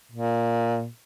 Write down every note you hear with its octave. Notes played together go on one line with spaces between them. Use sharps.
A#2